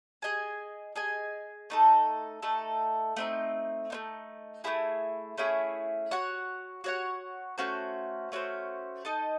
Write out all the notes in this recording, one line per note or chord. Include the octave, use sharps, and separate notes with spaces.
G#4 D#5 G#5
G#4 D#5 G#5
A3 D#4 A4
A3 D#4 A4
A3 C4 D#4
A3 C4 D#4
A3 C#4 E4 G#4
A3 C#4 E4 G#4
F#4 C#5 F#5
F#4 C#5 F#5
A3 C#4 F#4 C5
A3 C#4 F#4 C5
D#4 A4 D#5